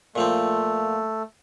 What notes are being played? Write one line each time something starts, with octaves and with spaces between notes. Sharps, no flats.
A#2 F3 A3 C4